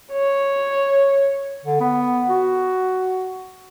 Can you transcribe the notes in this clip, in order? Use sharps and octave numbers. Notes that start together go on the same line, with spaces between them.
C#5
D3
B3
F#4